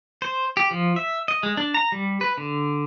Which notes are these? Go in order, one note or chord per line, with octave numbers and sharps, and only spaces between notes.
C5
G4
F3
E5
D#5
G#3
D4
A#5
G3
B4
D3